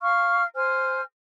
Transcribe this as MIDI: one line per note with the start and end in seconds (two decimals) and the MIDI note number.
0.01 0.43 77
0.01 0.43 85
0.01 0.43 89
0.56 1.02 72
0.56 1.02 80
0.56 1.02 89